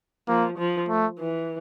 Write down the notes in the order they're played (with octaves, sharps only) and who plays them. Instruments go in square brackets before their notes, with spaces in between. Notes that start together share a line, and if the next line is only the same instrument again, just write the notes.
[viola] F3 [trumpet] A#3
[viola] F3
[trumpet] A3
[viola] E3